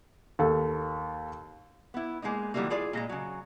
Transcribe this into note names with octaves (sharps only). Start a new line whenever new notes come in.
D#2 A4
B3 E4
G#3 A#3 B3 D#4
D#3 E3 F#3 G3 A3 A#3
E4 F4 G#4 D5
A#2 G#3 A#5
C#3 F#3